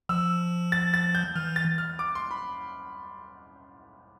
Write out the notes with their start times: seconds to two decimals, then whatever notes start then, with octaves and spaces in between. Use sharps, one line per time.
0.09 F3 E6
0.72 A6
0.94 A6
1.15 G6
1.35 E3 F6
1.56 A6
1.78 F6
1.99 D6
2.15 C6
2.31 B5